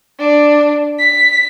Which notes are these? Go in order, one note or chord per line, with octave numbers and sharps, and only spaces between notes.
D4
B6